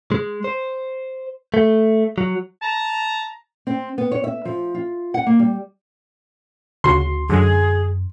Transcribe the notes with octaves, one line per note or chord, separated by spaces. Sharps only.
G#3
C5
A3
F#3
A5 A#5
C4
B3
C#5
E5
F3
F4
F#5
A#3
G3
D2 C#3 F#4 C6
F#2 D3 F#3 G#3 G#4